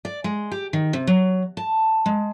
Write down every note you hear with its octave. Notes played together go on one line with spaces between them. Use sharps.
D5
G#3
G4
D#3
C3
F#3
A5
G#3